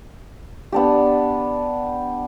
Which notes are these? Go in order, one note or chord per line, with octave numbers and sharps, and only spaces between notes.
B3 D4 G4